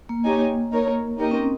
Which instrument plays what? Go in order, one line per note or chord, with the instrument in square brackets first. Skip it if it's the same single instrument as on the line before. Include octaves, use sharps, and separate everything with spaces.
[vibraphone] A#3
[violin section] D#4 G4 C#5 G#5
D#4 A#4 C#5
[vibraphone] A#3 [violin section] D#4 G4 A#4 D#5
[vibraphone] C#4
C4